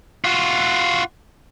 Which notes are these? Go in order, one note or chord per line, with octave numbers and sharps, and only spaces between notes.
F4 F#4